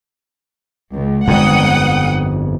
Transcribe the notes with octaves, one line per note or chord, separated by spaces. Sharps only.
C#2
G1 F2 G#3 F#5 G5 D#6